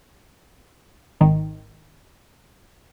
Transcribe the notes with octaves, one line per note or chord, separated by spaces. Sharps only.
G#1 D#3